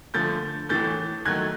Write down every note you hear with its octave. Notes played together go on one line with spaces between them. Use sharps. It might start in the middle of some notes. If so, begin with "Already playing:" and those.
D3 F3 A3 G6 A6
A2 E3 A3 G6 A6
D#3 F#3 A3 F#6 G#6